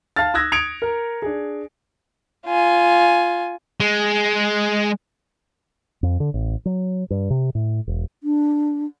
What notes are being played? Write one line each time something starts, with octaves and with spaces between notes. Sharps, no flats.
F5 A5 F6 A6
D#6 E6 F#6 G#6 A#6
D#6 G#6 C#7 D7 F7
A#4
D4 G#4
F4 G#5
G#3
F2
D3
A1
F#3
G2
C3
A2
E1
D4